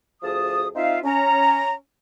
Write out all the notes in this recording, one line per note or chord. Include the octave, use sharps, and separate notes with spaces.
D2 F3 G#4 A5 D#6
C4 D#4 F4 E5 F5
C#4 A#5